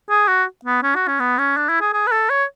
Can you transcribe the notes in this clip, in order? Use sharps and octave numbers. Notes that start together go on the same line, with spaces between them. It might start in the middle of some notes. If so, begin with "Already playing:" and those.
G#4
F#4
B3
C#4
F#4
C#4
B3
C#4
D4
E4
G#4
G#4
B4
A4
C#5